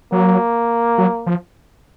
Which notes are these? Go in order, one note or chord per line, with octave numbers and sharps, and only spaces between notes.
F#3 A#3
F#3
F3